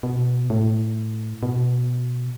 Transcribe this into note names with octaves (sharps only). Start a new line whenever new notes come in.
B2
A2
B2